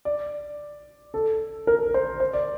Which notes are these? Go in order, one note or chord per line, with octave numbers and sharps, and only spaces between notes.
D5
A4
A#4
C5
C5
D5